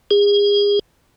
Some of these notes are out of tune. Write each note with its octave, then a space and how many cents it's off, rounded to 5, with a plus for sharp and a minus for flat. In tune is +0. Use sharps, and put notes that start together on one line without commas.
G#4 -30